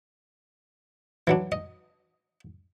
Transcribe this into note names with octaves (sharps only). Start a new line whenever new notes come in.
E3 F#3 D4
D#5